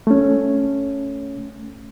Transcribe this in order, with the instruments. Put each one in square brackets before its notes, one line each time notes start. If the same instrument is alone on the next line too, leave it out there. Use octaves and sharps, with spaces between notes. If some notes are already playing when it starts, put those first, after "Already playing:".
[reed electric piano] A3 C#4